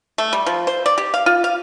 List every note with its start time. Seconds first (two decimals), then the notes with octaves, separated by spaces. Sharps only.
0.18 A3
0.33 G3
0.47 F3
0.67 C5
0.86 D5
0.98 G4
1.14 F5
1.26 F4
1.44 F5